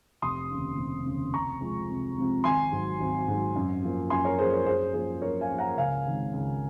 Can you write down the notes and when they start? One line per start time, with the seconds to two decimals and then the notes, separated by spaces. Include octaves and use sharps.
0.22 F1 C6 D#6
0.51 D#2 C#3
0.78 F1
1.06 D#2 C#3
1.34 C2 A#5 C#6
1.61 C3 F3 G#3 C4
1.89 C2
2.17 C3 F3 G#3 C4
2.44 G#1 G#5 C6
2.72 G#2 F#3
3.00 G#1
3.28 G#2 F#3
3.56 F#2
3.83 F3 A#3
4.10 F#2 G#5 C6
4.25 A#4 C#5
4.39 F3 A#3 G#4 C5
4.52 A#4 C#5
4.66 F#2 G#4 C5
4.94 F3 A#3 G#4 C5
5.21 F#2 A#4 C#5
5.41 F5 G#5
5.50 F3 A#3
5.59 F#5 A#5
5.77 C#2 F5 G#5
6.05 C3 D#3 G#3
6.33 C#2